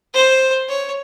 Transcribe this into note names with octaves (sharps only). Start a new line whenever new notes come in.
C5
C#5